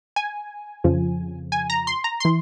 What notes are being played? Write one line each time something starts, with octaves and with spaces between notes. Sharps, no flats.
G#5
F2 C#3 F3
G#5
A#5
C6
A#5
E3 C6